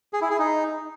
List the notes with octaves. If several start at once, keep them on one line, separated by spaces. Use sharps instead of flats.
G#4
E4
G#4
D#4